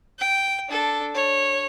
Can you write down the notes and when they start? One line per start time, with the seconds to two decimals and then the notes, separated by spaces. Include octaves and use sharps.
0.19 G5
0.69 D4 A4
1.15 C#5